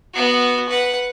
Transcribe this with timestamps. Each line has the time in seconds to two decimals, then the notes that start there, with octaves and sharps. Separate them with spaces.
0.14 B3 F#4
0.69 B4 F#5